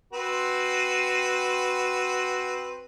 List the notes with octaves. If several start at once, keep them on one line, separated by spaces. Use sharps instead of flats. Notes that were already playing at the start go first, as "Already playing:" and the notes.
C4 F#4 B4